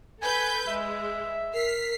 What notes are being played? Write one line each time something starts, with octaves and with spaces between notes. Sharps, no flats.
A4 B4 G#5 G6
G#3 E5
A#4 F6 B6 C7